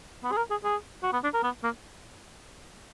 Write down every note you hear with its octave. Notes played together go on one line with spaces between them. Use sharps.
B3
G#4
A#4
G#4
G#4
F#4
B3
D4
A#4
B3
A#3